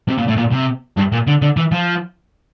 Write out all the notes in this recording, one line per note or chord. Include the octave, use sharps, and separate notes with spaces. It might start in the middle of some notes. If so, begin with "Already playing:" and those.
C3
A#2
A2
A#2
C3
G2
A#2
D3
D3
E3
F3